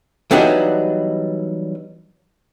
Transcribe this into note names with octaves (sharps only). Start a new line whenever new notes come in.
E3 F#3 G3 B3 D4 D#4